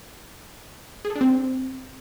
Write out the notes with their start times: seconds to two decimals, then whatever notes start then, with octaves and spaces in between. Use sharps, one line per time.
1.05 G#4
1.10 A4
1.15 D4
1.21 C4